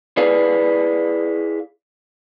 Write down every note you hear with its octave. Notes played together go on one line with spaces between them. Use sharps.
E4 G#4 B4 D5 F5